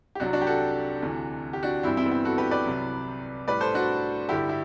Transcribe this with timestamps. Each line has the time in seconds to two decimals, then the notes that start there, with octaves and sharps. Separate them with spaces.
0.15 G4
0.20 C2 C3 F#3 D4 F#4
0.33 D4 F#4
0.41 G4
0.47 F#4 A4
1.02 D2 C3 E3
1.53 G4
1.63 D4 F#4
1.83 G2 E3 G3 C4 E4
1.97 C4 E4
2.06 B3
2.11 C4
2.25 F#4 A4
2.38 G4 B4
2.51 B4 D5
2.65 C2 C3 F#3
3.48 A2 G3 B4 D5
3.60 A4 C5
3.74 D4 F#4
4.29 G2 D3 G3 E4 G4
4.49 E4